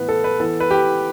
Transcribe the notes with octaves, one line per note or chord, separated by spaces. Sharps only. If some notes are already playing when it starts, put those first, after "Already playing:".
Already playing: A2 E3 B3 B4
A4
B4
E3 B3 A4
B4
G4